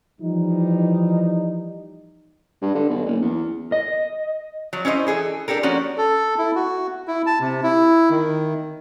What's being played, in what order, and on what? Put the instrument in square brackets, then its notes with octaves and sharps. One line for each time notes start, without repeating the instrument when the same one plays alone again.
[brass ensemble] E3 F3 G3 D#4
[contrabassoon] G2
D3
B1
F#1
E2
[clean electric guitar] D#5
[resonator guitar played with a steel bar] F3 F#3
C#4 E4 C5 D5 D#5
E3 G#4 A4
D4 G4 A4 A#4
F3 A#3 C#4 F#4
[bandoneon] A4
E4
F#4
E4
A5
C3
E4
D#3